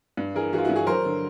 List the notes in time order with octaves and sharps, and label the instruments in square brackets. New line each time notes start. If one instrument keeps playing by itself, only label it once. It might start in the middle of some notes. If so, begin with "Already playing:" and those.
[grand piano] G2
E3 G#4 A#4
E3 F#4 G#4
F4
E4 F#4
G2
F#4 G#4
F#3 A#4 C5
D3